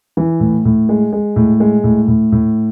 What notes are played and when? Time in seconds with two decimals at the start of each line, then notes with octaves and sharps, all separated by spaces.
0.17 E3
0.40 A2
0.65 A2
0.89 G#3
1.13 G#3
1.36 A2
1.60 G#3
1.84 A2
2.08 A2
2.32 A2